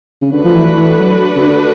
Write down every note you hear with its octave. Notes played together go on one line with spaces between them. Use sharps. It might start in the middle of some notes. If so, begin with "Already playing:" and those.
C#3
D3 A3 D4 F#4 B4
F3
E3
E3
F#3
C#3
D3